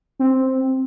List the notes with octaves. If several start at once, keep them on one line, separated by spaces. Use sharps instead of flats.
C4